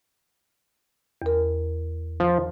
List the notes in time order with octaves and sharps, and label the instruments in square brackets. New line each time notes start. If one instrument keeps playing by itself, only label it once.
[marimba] E2 A#4
[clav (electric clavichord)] F3